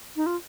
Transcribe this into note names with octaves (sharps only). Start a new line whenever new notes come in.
D#4
F4